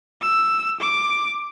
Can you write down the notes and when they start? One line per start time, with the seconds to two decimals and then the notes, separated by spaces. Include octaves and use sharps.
0.21 E6
0.80 D6